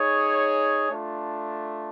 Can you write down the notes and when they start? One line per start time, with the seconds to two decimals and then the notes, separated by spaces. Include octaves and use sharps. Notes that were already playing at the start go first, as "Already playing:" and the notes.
Already playing: D#4 G#4 C#5
0.90 A3 D4 F4